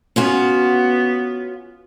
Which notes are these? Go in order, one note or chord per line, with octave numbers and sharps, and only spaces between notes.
B3 C#4 F4 F#4